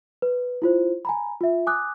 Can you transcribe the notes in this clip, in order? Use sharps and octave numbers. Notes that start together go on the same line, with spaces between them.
B4
E4 F4 C5
G#5 A#5 B5
F4 E5
G#5 D6 D#6 F#6